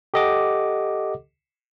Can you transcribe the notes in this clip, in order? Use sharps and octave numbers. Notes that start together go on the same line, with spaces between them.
G4 A4 D#5 F#5 D6